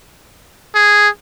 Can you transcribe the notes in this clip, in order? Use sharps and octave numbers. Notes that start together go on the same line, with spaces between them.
G#4